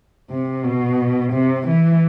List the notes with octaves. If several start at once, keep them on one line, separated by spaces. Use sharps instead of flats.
C3
B2
C3
E3